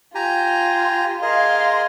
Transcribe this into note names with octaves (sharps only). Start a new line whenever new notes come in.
F4 G4 G#5 A#5
G#4 A#4 D#5 F5 C6